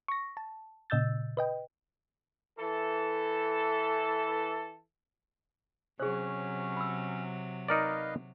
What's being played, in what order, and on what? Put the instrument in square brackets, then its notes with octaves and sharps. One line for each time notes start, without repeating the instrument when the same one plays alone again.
[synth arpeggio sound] C#6 A#6
A5
A#2 C#3 D#5 E6 G6 A6
B4 D#5 G5
[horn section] E3 A4
[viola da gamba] C3 F#3 [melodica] C#4 [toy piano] G#4 C5
[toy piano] B5 E6
[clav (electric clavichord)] D#4 A#4 D5 [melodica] B4 D#5 F5